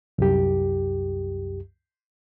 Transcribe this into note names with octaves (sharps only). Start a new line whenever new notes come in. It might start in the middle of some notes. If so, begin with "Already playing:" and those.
C2 F#2 G4